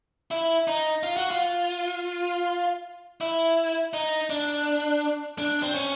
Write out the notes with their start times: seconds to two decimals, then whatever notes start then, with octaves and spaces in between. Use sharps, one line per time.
0.31 E4
0.67 D#4
1.03 F4
1.17 F#4
1.31 F4
3.21 E4
3.94 D#4
4.30 D4
5.38 D4
5.63 C4
5.74 C#4